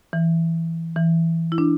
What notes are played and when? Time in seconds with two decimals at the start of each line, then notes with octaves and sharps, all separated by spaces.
0.13 E3
0.96 E3
1.52 E4
1.58 D4